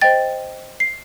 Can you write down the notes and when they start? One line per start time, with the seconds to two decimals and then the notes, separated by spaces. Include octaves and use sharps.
0.01 C5 D#5 G5 A6
0.80 C7